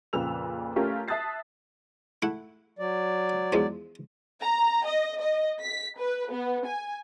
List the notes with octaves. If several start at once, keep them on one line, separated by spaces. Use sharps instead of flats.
F2 A#2 C#3 B4 E6 F7
A3 C#4 F4 G4 A#4
E5 A5 D#6 F#6 A6 C7
A3 E4 F#5
F#3 D5
E2 F3 G#3
A#5
D#5
D#5
B6
B4
B3
G#5